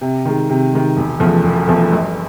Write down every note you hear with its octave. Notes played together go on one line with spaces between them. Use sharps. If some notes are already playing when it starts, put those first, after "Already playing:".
C3
D#3 G#3
C3
D#3 G#3
E1
E2 C#3 F3 A3
E1
E2 C#3 F3 A3
G1